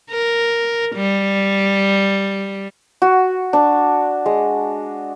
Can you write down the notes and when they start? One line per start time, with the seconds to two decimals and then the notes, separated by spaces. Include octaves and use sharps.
0.11 A#4
0.96 G3
3.02 F#4
3.53 D4
4.26 G#3